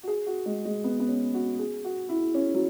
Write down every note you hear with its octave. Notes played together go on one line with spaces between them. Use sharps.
F#4
G#4
F#4
G#3
G#3
B3
B3
C#4
F#4
G#4
F#4
E4
C#4
F#3